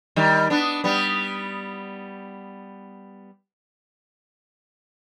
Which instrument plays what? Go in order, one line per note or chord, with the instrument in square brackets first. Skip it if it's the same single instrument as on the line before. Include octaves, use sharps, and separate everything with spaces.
[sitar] D#3 G3
B3 D4
G3 B3